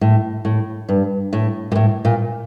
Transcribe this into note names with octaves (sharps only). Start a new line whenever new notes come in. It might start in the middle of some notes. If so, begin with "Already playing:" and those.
A2
A2
G2
A2
A#2
A2
A#2